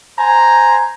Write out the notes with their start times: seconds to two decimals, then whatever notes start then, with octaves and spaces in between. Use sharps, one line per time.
0.19 C5 G#5 A#5